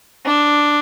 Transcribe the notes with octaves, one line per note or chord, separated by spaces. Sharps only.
D4